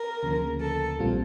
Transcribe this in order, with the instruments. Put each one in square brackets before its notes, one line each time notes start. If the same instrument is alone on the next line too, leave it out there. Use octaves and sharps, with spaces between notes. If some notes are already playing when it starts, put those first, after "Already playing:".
Already playing: [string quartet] A#4
[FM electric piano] D2 C#3 F3 A#3
[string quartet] A4
[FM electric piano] A#1 A#2 G3 C4 F4